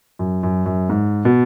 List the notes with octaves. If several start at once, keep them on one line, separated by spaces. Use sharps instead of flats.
F#2
F#2
F#2
G#2
B2